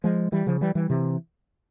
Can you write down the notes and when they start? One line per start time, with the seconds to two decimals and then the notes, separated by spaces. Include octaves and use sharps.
0.04 F3 G#3
0.32 E3 G3
0.47 C#3 F3
0.61 E3 G3
0.75 E3 G3
0.90 C3 E3